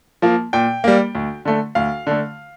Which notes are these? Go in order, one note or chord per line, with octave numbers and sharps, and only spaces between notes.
F3 A#3
A#2 G5
G3 A#3
D2
D3 A3
D2 F5
D3 A3